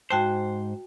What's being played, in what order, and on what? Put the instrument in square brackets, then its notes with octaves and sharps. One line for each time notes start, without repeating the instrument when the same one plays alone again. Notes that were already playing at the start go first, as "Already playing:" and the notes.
[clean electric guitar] G#2 C5 [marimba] F#4 G5 A5